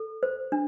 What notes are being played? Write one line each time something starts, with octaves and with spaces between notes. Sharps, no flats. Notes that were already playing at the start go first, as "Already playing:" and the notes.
Already playing: A4
C5
D4